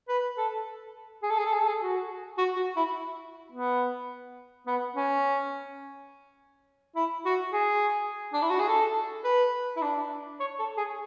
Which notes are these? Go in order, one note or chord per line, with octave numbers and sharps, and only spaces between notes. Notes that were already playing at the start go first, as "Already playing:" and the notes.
B4
A4
G#4
A4
G#4
A4
G#4
A4
G#4
F#4
F#4
F#4
E4
B3
B3
C#4
E4
F#4
G#4
D4
E4
F#4
G#4
A4
B4
E4
D4
C#5
A4
G#4